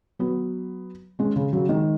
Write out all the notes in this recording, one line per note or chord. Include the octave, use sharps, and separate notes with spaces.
F#3 B3
G#3 C#4
C#3
C#3 F#3
D#3 G#3